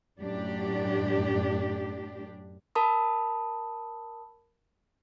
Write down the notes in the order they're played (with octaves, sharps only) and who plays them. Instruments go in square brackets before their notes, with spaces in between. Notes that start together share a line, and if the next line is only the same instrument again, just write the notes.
[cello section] F#2 A2 D4 G4
[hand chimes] A#4 A5 B5 D#6